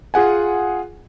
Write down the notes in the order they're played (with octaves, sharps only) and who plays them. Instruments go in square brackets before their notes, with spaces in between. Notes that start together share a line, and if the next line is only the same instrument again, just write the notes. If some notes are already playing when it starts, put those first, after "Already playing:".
[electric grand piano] F4 G#4 F#5 G#5